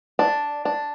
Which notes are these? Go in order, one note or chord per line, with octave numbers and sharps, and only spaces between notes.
D4
D4